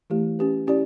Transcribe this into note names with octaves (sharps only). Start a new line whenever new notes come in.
E3 A3 E4 G4
C#4 G4 B4
C#4 E4 G4 D5